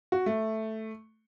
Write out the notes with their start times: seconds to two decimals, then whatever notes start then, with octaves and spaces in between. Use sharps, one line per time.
0.12 F#4
0.26 A3